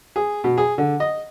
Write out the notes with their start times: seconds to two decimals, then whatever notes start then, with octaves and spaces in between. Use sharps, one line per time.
0.16 G#4
0.44 B2
0.58 G#4
0.78 D3
1.00 D#5